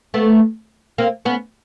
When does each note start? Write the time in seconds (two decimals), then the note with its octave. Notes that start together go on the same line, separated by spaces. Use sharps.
0.14 A3 B3
0.98 A#3 C4
1.25 B3 C#4